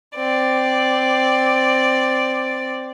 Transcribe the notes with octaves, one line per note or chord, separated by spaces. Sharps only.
C4 D5